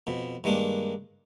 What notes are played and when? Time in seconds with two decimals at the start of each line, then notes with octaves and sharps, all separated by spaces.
0.07 F2 B2
0.44 G2 D#3 G#3 A#3 D4